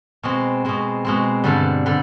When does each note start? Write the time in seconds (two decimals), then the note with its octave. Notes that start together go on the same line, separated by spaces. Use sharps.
0.23 B2 G#3 C4
0.65 B2 G#3 C4
1.05 B2 G#3 C4
1.44 G2 D3 G3
1.86 D3 G3